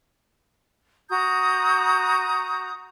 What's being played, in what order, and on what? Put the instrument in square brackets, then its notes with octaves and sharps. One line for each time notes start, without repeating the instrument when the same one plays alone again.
[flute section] F#4 A#5 D#6 G6